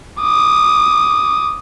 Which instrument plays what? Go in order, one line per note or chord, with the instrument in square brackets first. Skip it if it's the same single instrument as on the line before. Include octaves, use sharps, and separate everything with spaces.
[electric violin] D6 D#6